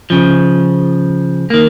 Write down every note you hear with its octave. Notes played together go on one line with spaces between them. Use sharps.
C#3 F3
D#3 A#3